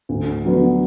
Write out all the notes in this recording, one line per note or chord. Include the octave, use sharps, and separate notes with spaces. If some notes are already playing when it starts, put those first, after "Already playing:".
D2
D3 F#3 B3 D4